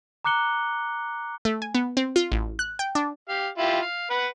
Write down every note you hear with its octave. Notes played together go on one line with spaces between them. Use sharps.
A#5 D6 F#6 C#7 G7
A3
G#5
B3
C4
F4
A1
F#6
G5
D4
G4 F5
E4 F4 G4
F5
B4 F#5